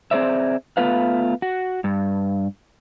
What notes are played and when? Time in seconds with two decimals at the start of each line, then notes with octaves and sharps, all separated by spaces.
0.11 C4 G#4 C5 D5 E5
0.77 A3 B3 F4 B4 F5
1.42 F#4
1.84 G2